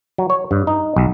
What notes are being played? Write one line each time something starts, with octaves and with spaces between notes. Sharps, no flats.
F#3
C#5
G2
D#4
B1